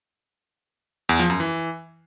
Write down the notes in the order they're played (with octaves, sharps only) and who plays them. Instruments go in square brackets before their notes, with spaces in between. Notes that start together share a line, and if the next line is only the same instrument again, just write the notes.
[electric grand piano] E2
F3
F#2
E3